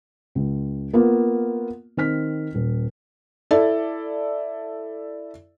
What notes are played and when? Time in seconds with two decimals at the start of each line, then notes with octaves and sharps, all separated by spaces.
0.35 C#2
0.93 A#3 B3 F4
1.97 D#3 C4 F6 B6
2.54 D#1
3.51 E4 A4 D5